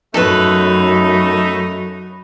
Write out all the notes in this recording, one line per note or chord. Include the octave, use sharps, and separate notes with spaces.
F#2 A3 D#4 A4 B4